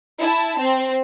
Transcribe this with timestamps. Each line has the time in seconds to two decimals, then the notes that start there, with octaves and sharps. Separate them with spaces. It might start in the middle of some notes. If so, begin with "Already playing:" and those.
0.21 E4 A5
0.59 C4